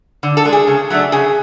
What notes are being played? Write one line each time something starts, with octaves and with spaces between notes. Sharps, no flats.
D3
A4
G#3 D4
G#4
C#3
F#3 A3 D4
C#3 G#4